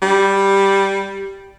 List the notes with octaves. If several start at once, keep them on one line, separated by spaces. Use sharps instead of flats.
G3